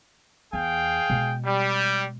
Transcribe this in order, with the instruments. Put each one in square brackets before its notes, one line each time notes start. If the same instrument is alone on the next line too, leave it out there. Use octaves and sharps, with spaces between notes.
[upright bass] E2 [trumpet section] G#4 F5 G5
[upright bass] B2 G#3
[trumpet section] G3